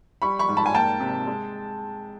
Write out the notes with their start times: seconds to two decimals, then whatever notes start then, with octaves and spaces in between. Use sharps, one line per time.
0.22 G3 B5 C#6
0.39 B5 C#6
0.49 G#2
0.57 A5 B5
0.66 G#5
0.74 A#3 G5 A5
1.00 C3
1.27 G#3